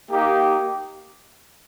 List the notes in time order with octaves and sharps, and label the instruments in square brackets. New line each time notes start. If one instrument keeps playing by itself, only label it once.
[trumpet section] A#3 D#4 G4